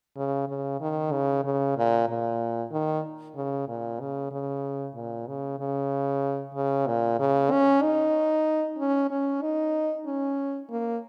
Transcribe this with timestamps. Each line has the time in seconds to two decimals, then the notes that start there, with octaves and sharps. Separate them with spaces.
0.17 C#3
0.48 C#3
0.81 D#3
1.12 C#3
1.44 C#3
1.77 A#2
2.08 A#2
2.72 D#3
3.36 C#3
3.68 A#2
4.00 C#3
4.31 C#3
4.95 A#2
5.27 C#3
5.59 C#3
6.55 C#3
6.87 A#2
7.19 C#3
7.51 C#4
7.82 D#4
8.78 C#4
9.10 C#4
9.42 D#4
10.06 C#4
10.70 A#3